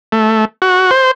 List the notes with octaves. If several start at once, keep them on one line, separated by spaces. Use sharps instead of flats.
A3
F#4
C5